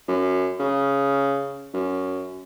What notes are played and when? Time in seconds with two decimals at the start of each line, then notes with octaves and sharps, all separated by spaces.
0.08 F#2
0.60 C#3
1.74 F#2